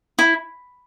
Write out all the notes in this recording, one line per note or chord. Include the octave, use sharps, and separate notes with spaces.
E4